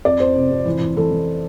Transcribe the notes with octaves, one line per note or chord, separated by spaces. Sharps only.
F2 D5
F2 C5
C3
F2
E3
E3
E3 A4
E3